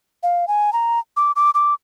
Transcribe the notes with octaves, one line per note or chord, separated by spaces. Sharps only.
F5
G#5
A#5
D6
D6
D6